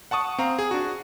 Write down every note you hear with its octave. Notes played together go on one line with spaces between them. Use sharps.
F#5 A5 C#6 D#6
C4 F5 A#5
G#4
D4 F#4